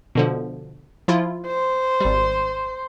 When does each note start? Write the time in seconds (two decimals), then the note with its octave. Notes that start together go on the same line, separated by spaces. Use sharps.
0.15 B2 D3 F3
1.08 F3 E4 F4
1.46 C5
2.00 G#1 G3